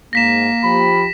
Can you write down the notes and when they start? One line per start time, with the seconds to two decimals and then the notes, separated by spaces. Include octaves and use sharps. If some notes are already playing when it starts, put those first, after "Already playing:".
0.13 G#2 A#3 A#6 B6 E7
0.64 F3 G4 B5